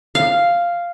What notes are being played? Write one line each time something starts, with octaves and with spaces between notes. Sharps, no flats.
F5